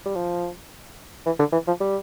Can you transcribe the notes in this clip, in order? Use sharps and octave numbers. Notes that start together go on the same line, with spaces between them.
G3
F3
E3
D3
E3
F3
G3